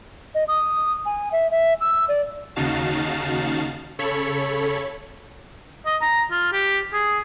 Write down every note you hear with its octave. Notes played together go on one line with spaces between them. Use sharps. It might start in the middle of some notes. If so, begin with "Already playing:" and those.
D#5
D#6
G#5
E5
E5
E6
D5
D#2 C#3 D#4 F#4 F5 A5
C#3 A4 C#5 B5 C#6
D#5
A#5
F4
G4
G#4